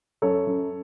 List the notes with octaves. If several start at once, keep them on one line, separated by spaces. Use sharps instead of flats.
F#2 A4 C#5
F#2